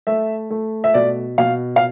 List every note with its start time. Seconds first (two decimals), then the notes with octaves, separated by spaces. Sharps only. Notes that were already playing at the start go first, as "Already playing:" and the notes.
0.07 A3 E5
0.50 A3
0.84 E5
0.94 B2 D5
1.38 B2 F5
1.76 F5